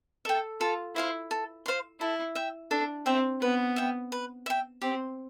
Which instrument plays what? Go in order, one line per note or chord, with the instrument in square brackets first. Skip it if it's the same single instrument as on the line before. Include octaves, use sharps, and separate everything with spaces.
[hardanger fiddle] A4 [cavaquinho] E5 G5
[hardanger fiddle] F4 [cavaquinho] A4
[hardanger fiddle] E4 [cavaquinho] C5 F5 C6
[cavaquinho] A4
C5 F5 C6
[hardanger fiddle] E4 [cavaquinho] A4
[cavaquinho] E5 G5
[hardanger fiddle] D4 [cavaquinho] A4
[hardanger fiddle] C4 [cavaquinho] E5 G5
[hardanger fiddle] B3 [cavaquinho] B4
[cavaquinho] E5 G5
B4
E5 G5
[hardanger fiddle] C4 [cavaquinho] G4